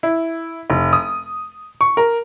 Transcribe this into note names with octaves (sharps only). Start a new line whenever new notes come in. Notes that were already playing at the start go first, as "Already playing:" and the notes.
E4
F1
D#6
C#6
A#4